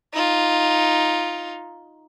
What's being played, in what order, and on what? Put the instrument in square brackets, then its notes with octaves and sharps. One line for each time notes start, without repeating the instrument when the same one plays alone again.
[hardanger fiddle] D#4 F4